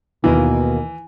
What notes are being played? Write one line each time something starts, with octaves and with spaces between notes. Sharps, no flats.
D#2 B2 D#3 E3 A#3